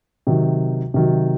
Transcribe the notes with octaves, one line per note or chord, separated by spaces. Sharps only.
C3 D#3 F#3
C3 D#3 F#3